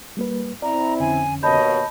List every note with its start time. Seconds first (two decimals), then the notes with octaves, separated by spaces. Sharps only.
0.17 G3 A#3 B4
0.62 C4 E4 D5 A#5
1.00 F2 D3 C#4 G#5
1.43 D#2 B2 C#5 D#5 A5 B5 G6